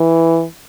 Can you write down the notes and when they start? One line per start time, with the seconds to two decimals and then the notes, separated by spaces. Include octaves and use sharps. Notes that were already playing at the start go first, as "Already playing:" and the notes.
Already playing: E3